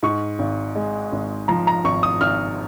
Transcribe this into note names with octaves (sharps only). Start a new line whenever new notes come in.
G#2 C#6
G#1
G#3
G#1
F3 A#5
A#5
G#1 C#6
D#6
G#1 F6